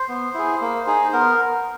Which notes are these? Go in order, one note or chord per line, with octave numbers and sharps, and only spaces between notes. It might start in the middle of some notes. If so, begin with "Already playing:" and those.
Already playing: C5
B3
E4 G#4
A#3
D#4 G#4
B3 A#4